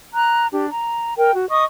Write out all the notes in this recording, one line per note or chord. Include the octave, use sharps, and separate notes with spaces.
A#5 F#6
D4 G4
A#5
A#4 G5
F#4
D#5 C#6 D#6